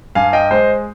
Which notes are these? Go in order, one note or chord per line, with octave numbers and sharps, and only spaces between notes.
G2 F5 G#5
D#5 G5
G#3 C5 D#5